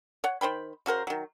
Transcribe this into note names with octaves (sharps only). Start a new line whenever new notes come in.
C#5 F#5
D#3 C5 G5 B5
C#3 F#4 A#4 C5
D#3 F#3